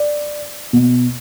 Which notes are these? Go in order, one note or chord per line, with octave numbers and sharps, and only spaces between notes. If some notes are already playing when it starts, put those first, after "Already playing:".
Already playing: D5
B2